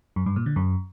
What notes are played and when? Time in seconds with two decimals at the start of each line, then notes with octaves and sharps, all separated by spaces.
0.16 F#2
0.26 G2
0.36 A#2
0.46 D3
0.56 F#2